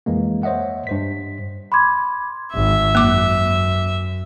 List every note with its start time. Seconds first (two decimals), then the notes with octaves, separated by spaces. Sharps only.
0.06 F2 E3 G#3 A#3
0.43 C5 C#5 D#5 E5 F#5
0.87 G2 C5 B6
1.72 B5 C6 D6 G#6
2.54 G#1 E5
2.95 F#2 A#3 D6